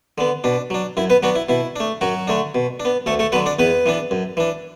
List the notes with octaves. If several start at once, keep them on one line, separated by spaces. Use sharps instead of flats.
D3 B3
B2 D4
F#3 D4
F#2 E4
B3 B4
F#3 B3 D4 F#4
E4
B2 E4
A3 D4
F#2 F#3 F#4
D3 A3 D4
B2
D4
B3
D2 A3 A4
A3 A4
D3 F#3 B3 B4
D4 D5
E2 B3 B4
E3 B3 D4
F#2
E3 D4